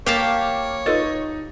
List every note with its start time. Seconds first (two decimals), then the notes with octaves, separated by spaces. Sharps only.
0.06 A#3 G4 A#4 C#5 F5 A5 F6
0.86 D#4 F4 A4 B4 D#5 A6